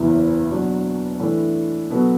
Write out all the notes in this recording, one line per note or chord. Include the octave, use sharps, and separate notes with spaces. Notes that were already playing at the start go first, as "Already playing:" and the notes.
Already playing: F#1 E2 E3 B3 E4
B2 F#3 D4 F#4
A2 E3 D4 A4
B2 F#3 B3 F#4 A4